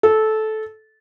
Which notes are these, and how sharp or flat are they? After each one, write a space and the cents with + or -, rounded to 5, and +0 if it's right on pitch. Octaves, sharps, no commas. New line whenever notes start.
A4 -15